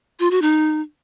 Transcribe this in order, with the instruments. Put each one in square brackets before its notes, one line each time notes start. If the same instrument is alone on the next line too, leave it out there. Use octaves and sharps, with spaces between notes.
[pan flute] F4
F#4
D#4